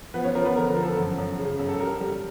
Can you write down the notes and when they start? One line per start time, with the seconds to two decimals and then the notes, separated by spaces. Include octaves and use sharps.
0.14 F3 B3 B4
0.24 C#4 C#5
0.35 F3 A#4
0.45 B3 B4
0.56 D3 A#4
0.70 A#4
0.76 F3
0.83 A4
0.97 F#2
1.18 F#2
1.39 C#3
1.59 F#2
1.68 A4
1.80 G3 A#4
2.01 G3